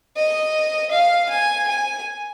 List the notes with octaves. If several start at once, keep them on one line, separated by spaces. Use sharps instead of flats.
D#5
F5
G#5
G#5